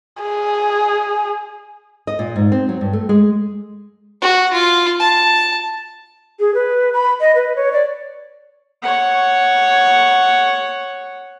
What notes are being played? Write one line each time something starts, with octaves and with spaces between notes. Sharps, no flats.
G#4
D#5
A#2
G#2
C4
F#3
G2
A3
G#3
F#4
F4
A5
G#4
B4
B5
D#5
B4
C#5
D5
C#5 F#5